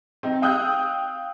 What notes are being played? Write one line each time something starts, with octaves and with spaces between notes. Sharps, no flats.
C4 D#4
F5 G5 D#6 E6 F#6 G6